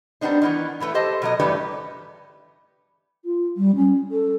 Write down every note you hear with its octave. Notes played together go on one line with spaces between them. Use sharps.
G3 B3 C4 D4 D#4
D#3 E3 B3
A2 E3 A3 B4
G4 A4 C5 D#5 A5
B2 F#3 D#5
G2 E3 A3 G4 B4 D5
F4
G3
C#4
A4